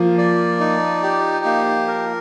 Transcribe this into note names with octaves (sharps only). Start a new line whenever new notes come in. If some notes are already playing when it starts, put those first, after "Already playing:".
Already playing: F3 A#3
D5
D#4
G4
A#3
A#4